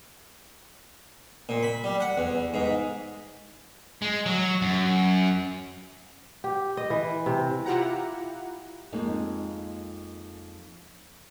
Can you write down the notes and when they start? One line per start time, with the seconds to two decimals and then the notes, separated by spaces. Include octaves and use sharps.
1.49 A#2
1.63 B5
1.84 G3
2.00 F#5
2.18 E2
2.54 G#2
4.02 G#3
4.26 F#3
4.62 F#2
6.44 G4
6.77 D#5
6.90 E3
7.26 C3
7.65 E4 F4 G4 F#5 A#5
8.92 F2 G#3 A#3 D#4